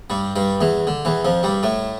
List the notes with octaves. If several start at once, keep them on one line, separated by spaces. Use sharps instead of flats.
G2 G3
G2 G3
E2 E3
D3
E2 E3
F2 F3
G2 G3
A2 A3